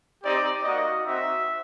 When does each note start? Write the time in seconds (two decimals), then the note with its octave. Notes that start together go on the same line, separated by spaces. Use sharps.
0.24 C4 D#4 G4 D5
0.64 A#3 D#4 F#4 D#5
1.06 C4 D#4 F#4 E5